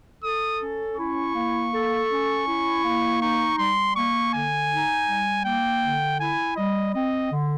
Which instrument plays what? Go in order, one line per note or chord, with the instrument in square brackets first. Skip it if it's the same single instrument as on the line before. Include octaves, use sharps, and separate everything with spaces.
[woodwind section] A4 [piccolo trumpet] D#6
[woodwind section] C#4
[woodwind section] E4 [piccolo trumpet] C#6
[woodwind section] A#3
A4
C#4
E4
A#3
[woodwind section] D#4 [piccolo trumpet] C#6
[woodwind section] G3 [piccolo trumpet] C6
[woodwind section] A#3 [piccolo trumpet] C#6
[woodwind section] D3 [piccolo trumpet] G#5
[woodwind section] D#4
G3
[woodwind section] A#3 [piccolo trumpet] G5
[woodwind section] D3
[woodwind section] E4 [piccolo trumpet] G#5
[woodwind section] G3 [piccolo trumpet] D#5
[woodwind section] C4 [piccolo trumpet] D#5
[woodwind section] D3